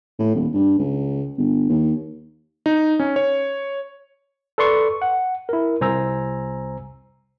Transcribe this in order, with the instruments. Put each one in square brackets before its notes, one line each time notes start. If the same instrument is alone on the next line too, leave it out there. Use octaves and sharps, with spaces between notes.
[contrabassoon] A2
D#1
G2
C#2
G1
D#2
[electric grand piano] D#4
C#4
C#5
[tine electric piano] A4 B4 D5 C6 C#6
F#5
E4 A#4
C2 C5 G#5 A#5 E6